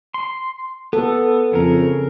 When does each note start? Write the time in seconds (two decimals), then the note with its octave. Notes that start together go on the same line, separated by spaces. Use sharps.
0.14 C6
0.93 B3 A4
1.53 F2 C#3 A#4